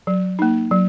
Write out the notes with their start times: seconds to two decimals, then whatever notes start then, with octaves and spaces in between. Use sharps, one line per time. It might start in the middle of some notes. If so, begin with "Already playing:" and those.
0.07 F#3
0.39 A#3 D#4
0.71 F#3